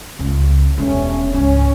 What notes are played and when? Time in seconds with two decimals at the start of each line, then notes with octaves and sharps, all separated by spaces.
0.19 C#2
0.78 E1 E2 G2 A3 C#4
1.32 C#2 G#2 C#4